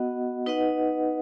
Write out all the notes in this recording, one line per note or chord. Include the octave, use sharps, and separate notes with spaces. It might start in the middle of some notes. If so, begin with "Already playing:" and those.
Already playing: B3 F#4 D#5 F#5
D#4 B4 D#5 F#5